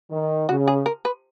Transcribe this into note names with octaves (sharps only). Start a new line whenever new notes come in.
D#3
C#3 F#4
G#4
A#4
B4